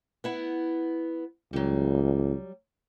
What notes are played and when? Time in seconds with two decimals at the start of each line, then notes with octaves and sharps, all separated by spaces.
0.24 B3 E4 F#5
1.53 C#2 F#3 G3